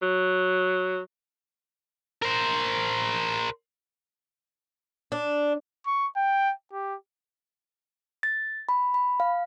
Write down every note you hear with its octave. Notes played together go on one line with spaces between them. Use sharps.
F#3
A#4 C5
D4
C#6
G5
G4
A6
B5
B5
F5